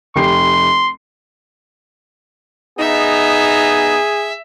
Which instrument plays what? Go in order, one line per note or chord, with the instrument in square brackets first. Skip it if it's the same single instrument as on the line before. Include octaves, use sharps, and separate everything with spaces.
[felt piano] F1 G4 C7 [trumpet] C6
[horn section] B3 D#4 [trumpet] G#4 [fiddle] E5